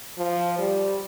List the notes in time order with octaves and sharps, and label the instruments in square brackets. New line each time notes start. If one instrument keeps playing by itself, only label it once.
[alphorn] F3
G3